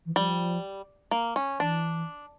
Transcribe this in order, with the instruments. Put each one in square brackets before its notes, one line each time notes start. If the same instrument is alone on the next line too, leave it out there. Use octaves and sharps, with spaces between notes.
[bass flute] E3
[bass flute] F3 [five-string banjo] G3
[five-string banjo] A#3
C#4
[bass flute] E3 [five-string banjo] D4